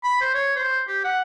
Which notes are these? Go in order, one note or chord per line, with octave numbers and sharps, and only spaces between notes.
B5
C5
C#5
C5
G4
F#5